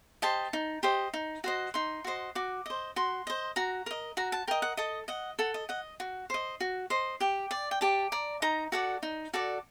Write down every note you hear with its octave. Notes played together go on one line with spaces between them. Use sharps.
G4 C5 D#5 A5
D#4
G4 C5 D#5
D#4
F#4 C5 D#5
D#4 C6
F#4 C5 D#5
F#4 D6
C5 D#5
F#4 C6
C5 D#5
F#4 A#5
A#4 D#5
F#4 A#5
A5
A#4 D#5 G5
F#5
A4 D#5
D#5 F#5
A4 F#5
D#5
D#5 F#5
F#4
C5 D#5
F#4
C5 D#5
G4 G5
D5
G5
G4 A5
D5 A#5
D#4 A#5
F#4 A4 D5 F#5
D#4
F#4 A4 D5